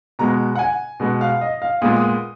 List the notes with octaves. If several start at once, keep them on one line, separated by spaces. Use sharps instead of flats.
B2 G#3 B3 A#5
F#5
G#5
B2 G#3 B3
F5
D#5
F5
A#2 G#3 B3 D#6
D#6